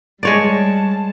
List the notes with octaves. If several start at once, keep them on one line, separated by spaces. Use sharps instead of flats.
G3 G#3 C#5 D5 A5